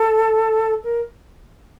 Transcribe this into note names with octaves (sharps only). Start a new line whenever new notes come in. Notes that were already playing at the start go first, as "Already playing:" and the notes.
Already playing: A4
A#4